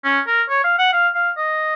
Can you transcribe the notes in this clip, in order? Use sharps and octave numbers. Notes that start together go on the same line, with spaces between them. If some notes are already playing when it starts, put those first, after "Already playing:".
C#4
A#4
C#5
F5
F#5
F5
F5
D#5